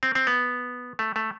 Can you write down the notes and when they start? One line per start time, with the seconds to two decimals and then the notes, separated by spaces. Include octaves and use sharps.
0.03 C4
0.15 C4
0.27 B3
0.99 A3
1.16 A3